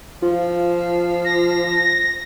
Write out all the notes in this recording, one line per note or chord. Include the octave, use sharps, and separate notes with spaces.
F3 F4
A#6